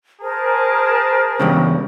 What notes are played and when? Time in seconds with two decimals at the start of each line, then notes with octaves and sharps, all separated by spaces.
0.21 G#4 A#4 C5 A5
1.40 E2 G2 C#3